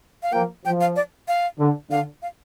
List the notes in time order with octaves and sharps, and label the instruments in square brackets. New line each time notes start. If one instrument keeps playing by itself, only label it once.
[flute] F5
[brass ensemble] F3 A#3 [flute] G5
[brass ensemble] F3 [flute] G5
[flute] F5
D5
F5
[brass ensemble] D3
[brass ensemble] D3 [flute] F5
[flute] F5